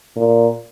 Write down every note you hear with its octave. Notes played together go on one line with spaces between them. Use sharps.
A#2